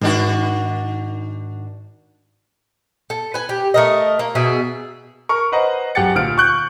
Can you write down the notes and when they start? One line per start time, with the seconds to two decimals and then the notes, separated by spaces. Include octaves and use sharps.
0.01 G#2 D#3 D4 F#4
3.10 A4
3.34 B4 G#5
3.49 G4
3.74 A3 A#4 D#5
4.19 A#3
4.35 B2 G#4 E5
5.29 A#4 C#6
5.52 B4 C5 D#5 F#5 A#5
5.95 F#2 G4 F#5 G5 A6 C#7
6.15 D2 A#2 F6 D7
6.38 C#6 F#6 G6